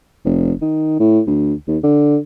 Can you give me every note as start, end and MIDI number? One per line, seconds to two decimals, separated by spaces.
0.25 0.53 29
0.62 0.99 51
1.00 1.20 45
1.27 1.54 38
1.68 1.77 39
1.84 2.18 50